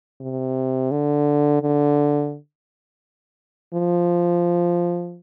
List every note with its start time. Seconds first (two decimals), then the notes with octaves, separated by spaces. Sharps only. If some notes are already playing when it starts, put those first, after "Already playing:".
0.21 C3
0.91 D3
1.62 D3
3.74 F3